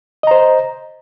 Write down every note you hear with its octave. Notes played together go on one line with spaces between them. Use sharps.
C5 D#5 A#5